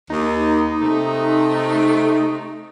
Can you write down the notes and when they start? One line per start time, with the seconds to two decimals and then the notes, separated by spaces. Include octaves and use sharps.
0.10 D#2 D#4
0.81 C3 A3